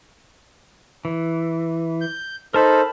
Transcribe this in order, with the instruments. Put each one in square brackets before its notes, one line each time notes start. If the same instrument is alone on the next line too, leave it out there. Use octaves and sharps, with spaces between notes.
[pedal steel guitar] E3
[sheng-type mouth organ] G6
[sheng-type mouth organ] D#4 A4 C5 [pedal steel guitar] A#4 A5 B5